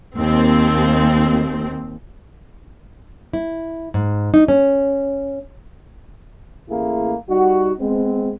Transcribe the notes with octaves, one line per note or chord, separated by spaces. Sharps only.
D#2 C4
E4
G#2
D#4
C#4
A1 A3 A#3 E4 G#4
G3 D#4 F#4
G#3 B3 C4